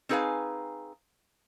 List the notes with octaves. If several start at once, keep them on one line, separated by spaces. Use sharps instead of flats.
C4 D#4 G#4 B4 F5 G#5